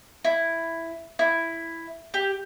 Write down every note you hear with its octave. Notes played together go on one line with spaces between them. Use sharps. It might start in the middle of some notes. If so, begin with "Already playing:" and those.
E4
E4
G4